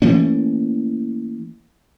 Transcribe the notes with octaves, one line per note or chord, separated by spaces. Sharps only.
E3 A3 A#3 C#4